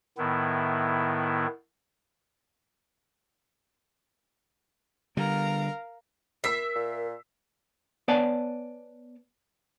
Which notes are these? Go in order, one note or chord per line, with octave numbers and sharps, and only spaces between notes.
A2 D#3 B3 E4
D3 G3 A#4 F5 A#5
A#4 E5 E6 B6 C7
A#2
B3 C#5 D5 F#5 G#5 A5